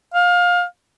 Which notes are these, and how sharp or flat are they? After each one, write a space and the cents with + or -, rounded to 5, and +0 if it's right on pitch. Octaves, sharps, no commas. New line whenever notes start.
F5 +25